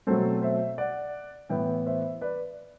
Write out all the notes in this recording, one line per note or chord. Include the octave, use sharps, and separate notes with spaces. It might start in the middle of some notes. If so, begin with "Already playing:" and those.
B2 F#3 A3 C4 A4 C5
C5 E5
D5 F#5
A2 E3 B3 E5 G5
C5 E5
B4 D5